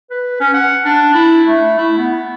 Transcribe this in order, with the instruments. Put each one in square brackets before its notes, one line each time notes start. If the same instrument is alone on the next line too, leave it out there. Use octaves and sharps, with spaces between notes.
[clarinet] B4
C#4
F#5
D4
E4
A3
E4
B3